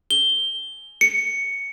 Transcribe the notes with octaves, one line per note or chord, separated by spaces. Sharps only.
G7
C#7